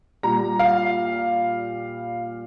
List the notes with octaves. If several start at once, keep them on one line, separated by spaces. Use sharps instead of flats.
A#2 G3 A#5
F5